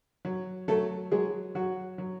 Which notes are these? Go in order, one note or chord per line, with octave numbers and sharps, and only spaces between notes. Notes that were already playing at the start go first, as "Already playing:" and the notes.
F#3
F#3 A3 A4
F#3 G#3 G#4
F#3 F#4
F#3